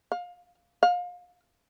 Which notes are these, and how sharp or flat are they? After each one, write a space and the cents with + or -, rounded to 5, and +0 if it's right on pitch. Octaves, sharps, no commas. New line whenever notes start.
F5 +25
F5 +30